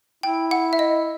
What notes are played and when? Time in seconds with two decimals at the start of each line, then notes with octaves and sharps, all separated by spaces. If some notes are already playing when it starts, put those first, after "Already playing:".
0.23 E4 G5
0.51 F#5
0.73 E5
0.79 D#5